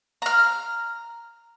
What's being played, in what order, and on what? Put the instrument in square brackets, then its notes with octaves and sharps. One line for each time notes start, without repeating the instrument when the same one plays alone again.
[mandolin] A#5 F6